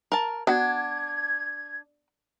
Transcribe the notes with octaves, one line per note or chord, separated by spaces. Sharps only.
A#4 A5
B3 D4 F#4 F#5 G#6